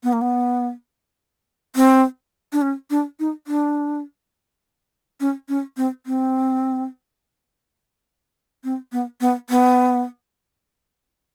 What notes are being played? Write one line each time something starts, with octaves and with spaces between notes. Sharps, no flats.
B3
A#3
B3
C4
D4
C#4
D4
D#4
D4
C#4
C#4
C4
C4
C4
B3
B3
B3